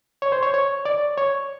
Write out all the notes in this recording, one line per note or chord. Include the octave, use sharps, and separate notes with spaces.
C#5
C5
C#5
C#5
D5
C#5